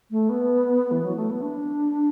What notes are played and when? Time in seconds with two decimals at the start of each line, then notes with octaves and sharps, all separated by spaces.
0.11 A3
0.29 B3
0.91 E3
1.04 F#3
1.16 A3
1.30 B3
1.42 D4